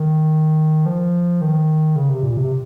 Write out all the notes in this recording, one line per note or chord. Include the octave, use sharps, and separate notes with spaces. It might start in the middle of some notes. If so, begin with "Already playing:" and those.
Already playing: D#3
F3
D#3
C#3
C3
A#2
C3